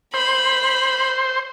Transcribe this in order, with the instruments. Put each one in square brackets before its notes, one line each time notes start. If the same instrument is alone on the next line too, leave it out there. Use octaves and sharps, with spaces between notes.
[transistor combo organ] C5 [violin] B5